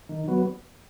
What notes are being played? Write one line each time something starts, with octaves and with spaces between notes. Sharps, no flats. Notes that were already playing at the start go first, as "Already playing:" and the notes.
D#3
F#3 B3